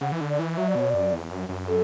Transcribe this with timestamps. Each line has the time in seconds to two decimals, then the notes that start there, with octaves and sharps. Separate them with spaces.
0.01 C#3 F#5
0.12 E3
0.21 D3
0.30 D5
0.39 E3
0.57 F#3 E5
0.69 D5
0.75 B2 C#5
0.90 F#2 D5
1.12 E2
1.31 F#2
1.49 F#2
1.68 A4